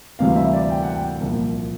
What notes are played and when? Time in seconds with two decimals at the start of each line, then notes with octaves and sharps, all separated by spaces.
0.19 D2 C3 E3 G3 C4 F5
0.36 E5
0.53 D5
0.70 G5
0.83 F#5
0.95 G5
1.20 C2 A#2 F3